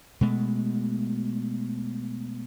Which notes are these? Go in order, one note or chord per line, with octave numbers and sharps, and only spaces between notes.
B2 G#3 A3